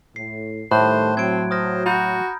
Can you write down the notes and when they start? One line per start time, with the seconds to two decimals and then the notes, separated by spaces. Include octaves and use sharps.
0.16 A2 C7
0.72 A2 D#3 G3 A3 C5 A5 C6 F#6
1.17 F#3 C4 G#6 D7
1.51 C5 D#6 F6 A#6
1.86 F#4 A#5 B5 G6